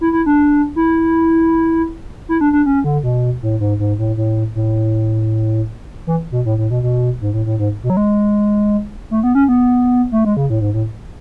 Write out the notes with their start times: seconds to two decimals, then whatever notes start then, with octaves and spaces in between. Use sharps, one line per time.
0.01 E4
0.13 E4
0.26 D4
0.76 E4
2.29 E4
2.41 D4
2.53 D4
2.66 C#4
2.84 D3
3.03 B2
3.42 A2
3.60 G#2
3.79 G#2
3.99 A2
4.17 A2
4.55 A2
6.07 E3
6.32 B2
6.46 A2
6.58 A2
6.71 B2
6.83 B2
7.21 G#2
7.34 A2
7.46 A2
7.59 G#2
7.83 B2
7.90 F#3
7.97 G#3
9.11 A3
9.23 B3
9.35 C#4
9.48 B3
10.12 A3
10.25 G#3
10.37 C#3
10.50 A2
10.61 G#2
10.74 A2